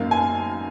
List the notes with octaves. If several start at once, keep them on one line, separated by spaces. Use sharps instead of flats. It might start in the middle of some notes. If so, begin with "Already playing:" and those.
Already playing: G#1 F#2 D#3 A#3 F5
G#5